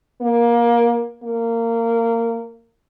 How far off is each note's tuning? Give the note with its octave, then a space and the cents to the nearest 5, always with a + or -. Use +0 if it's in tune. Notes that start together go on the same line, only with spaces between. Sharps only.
A#3 +20
A#3 -20